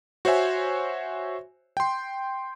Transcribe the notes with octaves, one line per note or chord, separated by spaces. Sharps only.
F#4 C5 C#5 E5 G#5
G5 C6